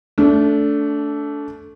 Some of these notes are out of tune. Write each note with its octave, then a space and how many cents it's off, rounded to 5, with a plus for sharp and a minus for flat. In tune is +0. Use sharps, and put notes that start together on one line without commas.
A3 +0 D4 -25